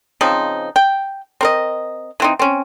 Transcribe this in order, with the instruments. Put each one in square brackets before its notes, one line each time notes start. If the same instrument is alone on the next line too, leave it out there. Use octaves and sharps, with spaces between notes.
[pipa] C#3 F3 C4 D#4
G5
C4 A#4 D#5
E3 C4 D#4
C4 C#4